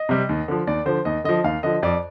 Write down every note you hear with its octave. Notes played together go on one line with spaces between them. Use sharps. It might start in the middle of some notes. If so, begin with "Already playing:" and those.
Already playing: D#5
C3 G3
D#2
D3 F3
D#2 D5
D3 F3 C5
D#2 D#5
D3 F3 D#5
D#2 F5
D3 F3 D#5
F2 D5